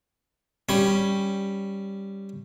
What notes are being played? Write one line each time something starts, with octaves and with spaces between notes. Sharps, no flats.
G3 C#4